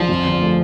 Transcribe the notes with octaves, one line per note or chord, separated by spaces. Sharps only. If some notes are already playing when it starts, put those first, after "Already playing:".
Already playing: A#1 F3
F2
G1
A3